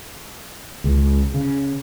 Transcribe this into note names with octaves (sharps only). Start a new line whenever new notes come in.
C#2
C#3